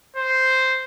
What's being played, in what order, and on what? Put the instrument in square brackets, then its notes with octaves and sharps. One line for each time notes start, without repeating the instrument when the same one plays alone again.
[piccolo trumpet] C5